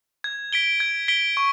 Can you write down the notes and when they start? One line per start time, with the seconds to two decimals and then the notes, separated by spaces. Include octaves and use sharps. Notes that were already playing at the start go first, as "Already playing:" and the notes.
0.24 G#6
0.53 B6 D7 G7
0.80 G#6
1.08 B6 D7 G7
1.37 C#6